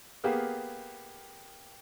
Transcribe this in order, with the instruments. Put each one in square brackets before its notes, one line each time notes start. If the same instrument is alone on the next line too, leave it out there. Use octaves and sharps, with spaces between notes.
[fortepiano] A#3 B3 G4 G#4 F5